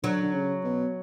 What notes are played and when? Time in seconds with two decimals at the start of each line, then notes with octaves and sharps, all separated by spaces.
0.03 D3 F#3
0.22 D3
0.34 C#3
0.64 B2